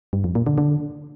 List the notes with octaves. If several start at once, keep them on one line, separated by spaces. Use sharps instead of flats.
G2
F2
A#2
D3
D3